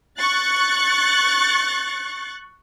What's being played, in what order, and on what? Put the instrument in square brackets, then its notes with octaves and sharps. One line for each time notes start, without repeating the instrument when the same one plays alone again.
[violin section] C#6 F#6 A6